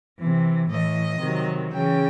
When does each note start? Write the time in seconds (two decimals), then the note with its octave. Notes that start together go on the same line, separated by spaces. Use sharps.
0.19 C3 E3
0.70 A2 E3 D#5
1.22 C3 D#3 F#3
1.72 C#3 E3 G5